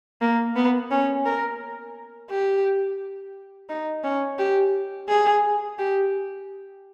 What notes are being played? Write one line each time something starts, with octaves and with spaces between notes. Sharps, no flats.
A#3
B3
C#4
A#4
G4
D#4
C#4
G4
G#4
G4